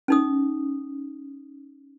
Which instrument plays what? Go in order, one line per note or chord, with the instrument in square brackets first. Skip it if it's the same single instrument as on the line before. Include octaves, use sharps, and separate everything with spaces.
[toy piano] C#4 D#4 D#6